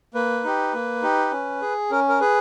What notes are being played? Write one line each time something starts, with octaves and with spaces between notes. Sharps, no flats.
A#3 B4
D#4 G4
A#3
D#4 G4
C#4
G#4
C#4 A#4
A#4
G#4 B4